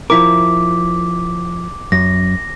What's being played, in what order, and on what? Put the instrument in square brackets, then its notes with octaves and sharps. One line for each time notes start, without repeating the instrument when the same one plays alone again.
[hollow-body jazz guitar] F3 E4 A#4 [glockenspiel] D6 B6
[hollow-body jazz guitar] F#2 [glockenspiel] A#6